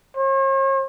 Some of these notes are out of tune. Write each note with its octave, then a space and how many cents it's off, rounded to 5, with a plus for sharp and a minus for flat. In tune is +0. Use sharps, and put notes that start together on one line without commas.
C#5 -45